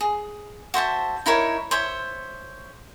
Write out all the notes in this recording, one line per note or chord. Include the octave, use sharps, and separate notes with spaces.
G#4
F#4 C5 E5 A5
D#4 E4 A#4 C#5
C5 C#5 E5